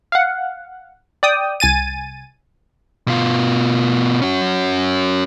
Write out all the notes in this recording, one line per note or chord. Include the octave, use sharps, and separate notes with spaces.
F5 F#5
D5 G5 D#6
C2 G#5 A6 D#7
B2 F4
C#4 F#4